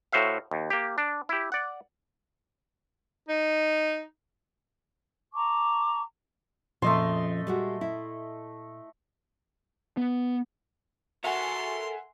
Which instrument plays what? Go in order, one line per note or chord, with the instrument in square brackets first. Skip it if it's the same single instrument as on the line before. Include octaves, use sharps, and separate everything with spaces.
[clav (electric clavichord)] A2 F#4 C5 E5 F5
D#2
A#3 G4
D4
E4 G4
D5 F#5
[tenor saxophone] D#4
[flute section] A5 A#5 C#6 D6
[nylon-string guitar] F2 C#3 F3 [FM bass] A#2 [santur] A3 D#5 C6
[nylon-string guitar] G3 G#3 F#4
E4
[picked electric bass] B3
[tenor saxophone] F#4 [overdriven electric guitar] A4 A#4 [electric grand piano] E5 F#5 G#5 [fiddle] C6